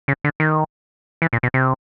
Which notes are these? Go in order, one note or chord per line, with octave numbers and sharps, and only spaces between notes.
C#3
D3
D#3
E3
A#2
B2
C3